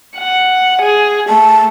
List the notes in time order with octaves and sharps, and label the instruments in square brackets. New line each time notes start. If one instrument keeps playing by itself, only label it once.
[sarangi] F#5
G#4
[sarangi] A3 [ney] A5